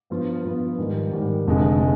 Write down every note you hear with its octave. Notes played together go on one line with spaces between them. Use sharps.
G2 F3 B3 F4
G2 F3 B3 F4
G#2 D#3 G3
G#2 D#3 G3
F1 F2 D3 G#3
G#3